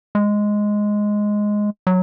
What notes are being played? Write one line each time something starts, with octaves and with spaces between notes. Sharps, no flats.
G#3
F#3